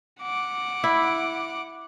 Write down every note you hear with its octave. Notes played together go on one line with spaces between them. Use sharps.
F#5 D6
E4